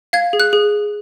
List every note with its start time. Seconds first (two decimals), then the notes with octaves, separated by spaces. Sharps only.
0.13 F5 G#6
0.33 G#4
0.40 F#6
0.53 G#4